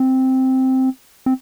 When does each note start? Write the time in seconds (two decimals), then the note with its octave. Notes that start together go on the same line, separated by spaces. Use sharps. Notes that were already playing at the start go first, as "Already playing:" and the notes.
Already playing: C4
1.26 C4